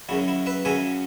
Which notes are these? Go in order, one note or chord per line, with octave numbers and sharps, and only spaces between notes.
F#2 C#3 F#3 E4
E4
B4 E5
F#2 C#3 F#3 E5 G#5